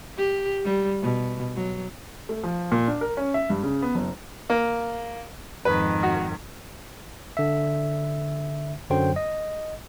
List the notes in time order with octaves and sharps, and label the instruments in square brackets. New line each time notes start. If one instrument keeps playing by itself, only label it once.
[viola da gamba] G4
G3
B2
F#3
[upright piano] A3
F3
A#2
D4
A#4
C#4
E5
G2
C#3
B3
F#1
[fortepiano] A#3
[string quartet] F2 G#2 D#3 [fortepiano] B4
[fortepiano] F#4
[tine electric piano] D3 E5
F#2 D3 F#3 C5 G5
D#5